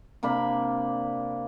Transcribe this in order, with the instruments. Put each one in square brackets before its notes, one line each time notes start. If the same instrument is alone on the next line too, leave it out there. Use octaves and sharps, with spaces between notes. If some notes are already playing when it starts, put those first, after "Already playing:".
[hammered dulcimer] C3 A#3 D4 B5